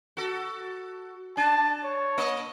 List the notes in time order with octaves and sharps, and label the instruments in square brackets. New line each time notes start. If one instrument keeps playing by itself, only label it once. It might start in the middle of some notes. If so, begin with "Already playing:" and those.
[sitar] F#4 A4
[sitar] D4 [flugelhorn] A5
[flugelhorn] C#5
[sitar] A#3 D#5